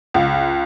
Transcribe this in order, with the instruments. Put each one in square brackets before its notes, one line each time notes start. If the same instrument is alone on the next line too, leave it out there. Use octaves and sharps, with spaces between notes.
[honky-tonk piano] C#2